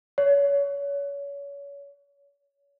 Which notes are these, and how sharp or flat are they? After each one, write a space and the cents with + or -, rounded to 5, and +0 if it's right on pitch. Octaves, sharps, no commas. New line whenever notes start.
C#5 +30